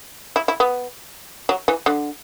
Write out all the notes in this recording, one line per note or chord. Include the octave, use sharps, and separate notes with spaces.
E4
E4
B3
F#3
E3
D3